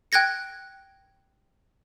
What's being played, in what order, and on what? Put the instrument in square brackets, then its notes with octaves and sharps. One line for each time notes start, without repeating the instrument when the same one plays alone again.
[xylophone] G5 F#6 G#6 A#6 C#7